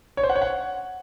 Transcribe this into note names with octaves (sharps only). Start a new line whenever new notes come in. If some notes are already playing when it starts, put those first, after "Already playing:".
C#5
C5
F#5
C#5
F#5